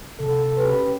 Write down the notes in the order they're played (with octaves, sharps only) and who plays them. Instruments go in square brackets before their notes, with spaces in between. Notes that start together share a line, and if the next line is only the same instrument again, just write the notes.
[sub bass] C3 [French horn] A4
[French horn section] C#4 G4 B4